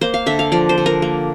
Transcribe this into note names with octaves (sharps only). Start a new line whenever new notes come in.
A#3 C5
F5
D3 E5
F5
F3 D5
C5
D3
A#4
A#3